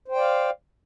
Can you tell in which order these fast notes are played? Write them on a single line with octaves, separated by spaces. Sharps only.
C5 G5 D5 F5